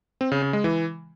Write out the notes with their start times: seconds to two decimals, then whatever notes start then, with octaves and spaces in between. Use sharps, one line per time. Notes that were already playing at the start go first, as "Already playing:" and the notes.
0.21 C4
0.32 C#3
0.42 C#3
0.53 G#3
0.64 E3